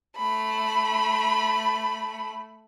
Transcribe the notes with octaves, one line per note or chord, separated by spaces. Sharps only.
A3 B5